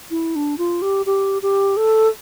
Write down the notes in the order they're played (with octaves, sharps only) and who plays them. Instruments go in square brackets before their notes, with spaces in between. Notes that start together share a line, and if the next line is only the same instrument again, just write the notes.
[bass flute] E4
D4
F4
G4
G4
G4
A4